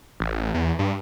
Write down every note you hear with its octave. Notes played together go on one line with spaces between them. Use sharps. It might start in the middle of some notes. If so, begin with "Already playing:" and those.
A1
E2
G2